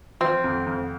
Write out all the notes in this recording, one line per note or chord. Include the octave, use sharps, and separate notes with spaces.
F3 C4
F2
F2